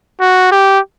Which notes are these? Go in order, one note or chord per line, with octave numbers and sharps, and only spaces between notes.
F#4
G4